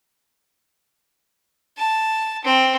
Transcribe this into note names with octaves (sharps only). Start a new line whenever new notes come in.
A5
C4